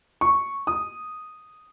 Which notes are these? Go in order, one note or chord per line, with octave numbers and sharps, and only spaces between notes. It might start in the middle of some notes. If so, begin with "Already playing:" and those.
C#6
D#6